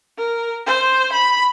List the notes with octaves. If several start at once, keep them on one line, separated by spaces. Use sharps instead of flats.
A#4
C5
B5